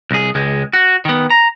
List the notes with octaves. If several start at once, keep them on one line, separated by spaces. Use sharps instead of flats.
C2 G#4
C#2 G#3
F#4
D#3 B3
A#5